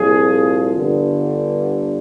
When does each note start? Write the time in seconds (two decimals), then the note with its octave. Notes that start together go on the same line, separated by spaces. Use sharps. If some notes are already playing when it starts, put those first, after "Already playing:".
Already playing: C2 A#2 F3 G#4
0.75 G1 G2 D3